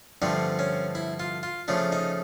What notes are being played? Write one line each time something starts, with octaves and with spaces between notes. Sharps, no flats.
G2 D3 F3 A3 C4 D4
C#4
E4
F4
F4
C#3 F3 A3 D4
D#4